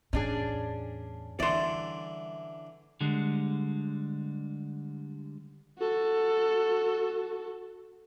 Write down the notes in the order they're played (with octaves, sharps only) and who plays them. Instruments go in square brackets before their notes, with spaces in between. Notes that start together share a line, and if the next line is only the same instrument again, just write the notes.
[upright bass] E2 A2 [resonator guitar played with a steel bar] C#4 D4 G#4
[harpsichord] D3 E3 [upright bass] G3 [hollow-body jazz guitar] D5 C6
[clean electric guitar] D3 G3 G#3
[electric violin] F#4 A4